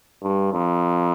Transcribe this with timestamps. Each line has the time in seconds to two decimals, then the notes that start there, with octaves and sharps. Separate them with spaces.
0.23 G2
0.54 F2